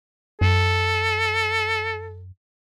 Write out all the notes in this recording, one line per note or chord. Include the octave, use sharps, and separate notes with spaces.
F#2 A4